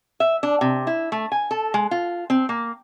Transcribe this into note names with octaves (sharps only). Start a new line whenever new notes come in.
E5
D4
C3
E4
A3
G#5
A4
G#3
F4
C4
A#3